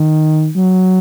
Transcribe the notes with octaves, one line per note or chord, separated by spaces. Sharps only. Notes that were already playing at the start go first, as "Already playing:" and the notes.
Already playing: D#3
F#3